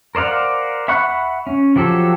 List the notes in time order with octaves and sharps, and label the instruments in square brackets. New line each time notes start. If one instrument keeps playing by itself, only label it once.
[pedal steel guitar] A#4 C5 D5 F5 F#5
E5 F#5 B5 C#6 F#6
C#4
F3 F#3 G4 A4